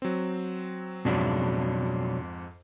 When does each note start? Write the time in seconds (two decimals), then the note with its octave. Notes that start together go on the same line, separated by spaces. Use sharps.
0.02 F#3 C4
1.05 F2 G#2 B2 F#3 D4